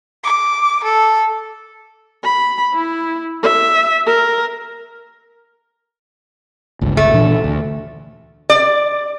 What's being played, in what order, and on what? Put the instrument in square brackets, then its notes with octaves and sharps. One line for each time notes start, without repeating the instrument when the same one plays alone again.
[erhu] D6
A4
[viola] B5
E4
E5
A#4
[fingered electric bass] G1 C#2
[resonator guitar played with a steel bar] A3
[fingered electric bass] A#2 E3 D4
D2
[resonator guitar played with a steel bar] D5